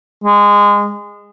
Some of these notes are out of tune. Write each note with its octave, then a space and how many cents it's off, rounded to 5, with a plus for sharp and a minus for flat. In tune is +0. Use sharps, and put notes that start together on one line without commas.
G#3 -20